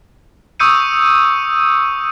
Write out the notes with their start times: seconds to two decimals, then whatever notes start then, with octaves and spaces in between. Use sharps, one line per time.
0.60 C#6 D#6 E6 G6 C#7 D#7